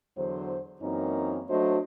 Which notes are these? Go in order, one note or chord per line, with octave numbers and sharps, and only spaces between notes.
E2 D3 F#3 C5
F#2 E3 A#3 C4 C#4 D#4
F#3 A3 D4 F#4 C5 D#5